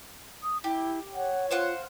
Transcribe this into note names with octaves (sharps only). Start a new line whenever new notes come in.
D#6
E4 G4
C#5 F#5
F4 C5 F5 F#5